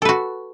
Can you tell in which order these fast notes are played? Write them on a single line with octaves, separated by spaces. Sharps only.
A4 B4 F#4